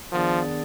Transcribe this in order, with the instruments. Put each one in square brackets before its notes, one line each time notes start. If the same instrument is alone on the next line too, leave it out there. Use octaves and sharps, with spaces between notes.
[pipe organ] D#3 B3 D4 G#4 D5 [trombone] F3